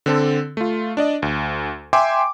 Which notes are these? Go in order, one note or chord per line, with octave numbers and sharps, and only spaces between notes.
D3 C4 A4
A3 F4
D4 D5 D#5
D2
E5 G5 G#5 C6 D6